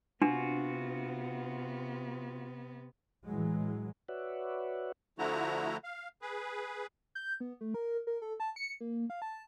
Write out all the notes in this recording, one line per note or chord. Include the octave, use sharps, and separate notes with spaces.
C3 B3 D4 F4 F#4
A2 E3 F#3 G#3
F#4 B4 C#5 D5 E5 F#5
D3 F3 A3 E4 F#4 A#5
F5
G#4 B4
G6
B3
A3
A#4
A#4
A4
A5
C#7
A#3
F5
A5